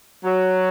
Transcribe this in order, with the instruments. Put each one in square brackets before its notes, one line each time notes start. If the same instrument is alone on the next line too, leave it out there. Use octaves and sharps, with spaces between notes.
[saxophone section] F#3